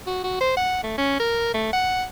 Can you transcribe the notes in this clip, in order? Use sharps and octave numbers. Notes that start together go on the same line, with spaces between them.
F#4
F#4
C5
F#5
A3
C#4
A#4
A3
F#5